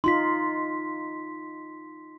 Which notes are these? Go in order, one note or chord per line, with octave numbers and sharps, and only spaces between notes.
D#4 F4 C6 B6